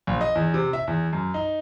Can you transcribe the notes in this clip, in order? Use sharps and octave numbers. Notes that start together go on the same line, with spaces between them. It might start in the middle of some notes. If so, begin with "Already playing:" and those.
A#1
D#5
E2
C3
E5
E2
F#2
D#4